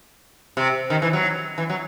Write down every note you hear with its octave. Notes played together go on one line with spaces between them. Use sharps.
C3
D#3
E3
F#3
E3
F#3